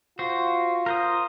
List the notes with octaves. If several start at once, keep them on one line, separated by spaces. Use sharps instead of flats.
F4 F#4 C5
A#4 C5 D#6